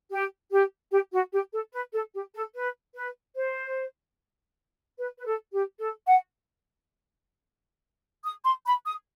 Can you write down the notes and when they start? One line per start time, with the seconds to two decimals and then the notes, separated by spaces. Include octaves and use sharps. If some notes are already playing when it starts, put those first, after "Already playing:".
0.10 G4
0.50 G4
0.91 G4
1.12 F#4
1.31 G4
1.52 A4
1.73 B4
1.93 A4
2.13 G4
2.34 A4
2.54 B4
2.94 B4
3.35 C5
4.98 B4
5.18 B4
5.25 A4
5.52 G4
5.79 A4
6.07 F#5
8.24 D#6
8.44 C6
8.65 B5
8.86 D#6